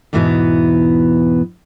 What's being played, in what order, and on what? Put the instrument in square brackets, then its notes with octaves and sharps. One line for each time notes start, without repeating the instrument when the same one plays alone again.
[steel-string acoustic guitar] E2 G#2 B2 E3 B3